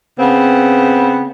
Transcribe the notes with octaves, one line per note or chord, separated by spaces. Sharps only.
C#3 B3 C4